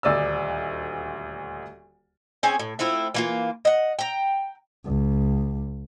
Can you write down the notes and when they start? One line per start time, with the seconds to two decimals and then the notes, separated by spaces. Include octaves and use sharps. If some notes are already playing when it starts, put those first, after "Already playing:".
0.03 D#1 D2 D5 D#5 E6
2.43 C4 C#4 G#4 G#5
2.59 A2
2.79 A3 C4 E4 F4
3.14 E3 A#3 F4
3.65 D#5 F#5
3.99 G5 A#5
4.85 C#2